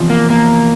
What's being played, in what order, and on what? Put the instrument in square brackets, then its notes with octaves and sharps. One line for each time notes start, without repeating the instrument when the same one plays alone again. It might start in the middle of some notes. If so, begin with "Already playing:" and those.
Already playing: [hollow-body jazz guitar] E2 C3 F3
[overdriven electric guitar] A#3
A#3